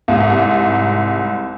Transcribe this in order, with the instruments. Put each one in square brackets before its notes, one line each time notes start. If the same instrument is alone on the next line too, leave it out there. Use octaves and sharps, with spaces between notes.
[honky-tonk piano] C2 G#2